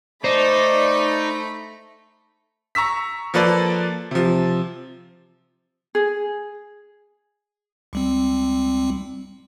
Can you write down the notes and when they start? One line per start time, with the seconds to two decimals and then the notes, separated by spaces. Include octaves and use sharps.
0.24 A3 D#4 C5 D5 B5
2.75 A#5 C#6 E6 B6
3.34 F3 A#3 A4 B4 D5
4.11 C3 F3
5.95 G#4
7.93 C#2 G3 C4